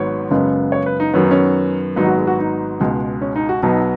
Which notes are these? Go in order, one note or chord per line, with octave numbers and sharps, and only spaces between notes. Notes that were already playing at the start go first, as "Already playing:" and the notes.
Already playing: G#1 G#2 F#3 B3 C#5
F#1 F#2 C#3 G#3 B3
C#5
B4
D#4
F#2 D#3 F#3 B3 C#4
D#4
C#4
G#1 G#2 F#3 B3 D#4
F#4
G#4
F#4
D#4
C#2 B2 G#3
C#4
D#4
F#4
B1 B2 F#3 B3 D#4